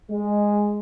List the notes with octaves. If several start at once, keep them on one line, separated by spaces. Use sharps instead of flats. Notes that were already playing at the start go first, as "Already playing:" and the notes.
G#3